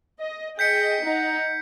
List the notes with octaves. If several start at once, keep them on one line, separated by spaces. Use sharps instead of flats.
D#5
G#4 D#5 G5 G6 B6 C#7
D#4 F#5